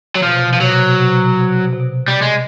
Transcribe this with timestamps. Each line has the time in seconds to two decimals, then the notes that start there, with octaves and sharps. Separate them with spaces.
0.15 F#3
0.23 B2 F3
0.32 C3
0.39 B2
0.47 C3
0.53 B2 F3
0.61 C3 F#3
0.70 B2
0.79 C3
0.87 B2
0.94 C3
1.01 B2
1.09 C3
1.18 B2
1.26 C3
1.33 B2
1.41 C3
1.49 B2
1.57 C3
1.65 B2
1.73 C3
1.80 B2
2.08 C3 G3
2.22 G#3